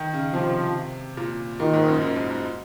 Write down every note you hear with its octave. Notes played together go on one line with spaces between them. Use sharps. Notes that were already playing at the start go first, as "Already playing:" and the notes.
Already playing: D#3
C#3
C3 F3
A#2
A#2 D#3
G#2
F#2
F#2
G#2
G#2